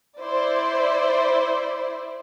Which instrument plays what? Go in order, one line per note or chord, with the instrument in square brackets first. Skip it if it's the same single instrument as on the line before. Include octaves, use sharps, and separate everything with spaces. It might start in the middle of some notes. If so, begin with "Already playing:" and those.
[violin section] E4 C5 D5